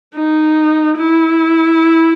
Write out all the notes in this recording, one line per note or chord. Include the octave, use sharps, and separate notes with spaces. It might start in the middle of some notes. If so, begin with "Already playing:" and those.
D#4
E4